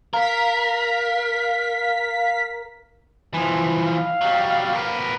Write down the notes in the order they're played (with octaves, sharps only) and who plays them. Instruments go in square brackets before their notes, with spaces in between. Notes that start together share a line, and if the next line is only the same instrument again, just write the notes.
[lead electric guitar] A#4 [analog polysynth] F5 B6
[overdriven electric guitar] E3 F3
[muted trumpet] F5
[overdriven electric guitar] F#3 G3
B3 A#4